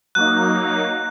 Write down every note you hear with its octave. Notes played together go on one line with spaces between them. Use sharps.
F#3 A#3 D#4 F#6